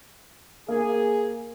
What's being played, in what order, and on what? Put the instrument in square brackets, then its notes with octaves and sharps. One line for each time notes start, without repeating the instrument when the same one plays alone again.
[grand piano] A#3 [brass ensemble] G#4